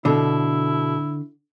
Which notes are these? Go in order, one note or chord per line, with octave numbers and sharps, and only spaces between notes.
B2 D3 E4 A4